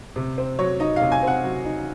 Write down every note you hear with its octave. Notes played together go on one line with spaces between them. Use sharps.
C3
C4
F#3 C#5
D#4 D#5
C3 F5
G#5
C4 F#5
F#3
D#4